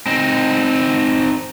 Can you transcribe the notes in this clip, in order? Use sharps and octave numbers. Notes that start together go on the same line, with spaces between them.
C4 D#4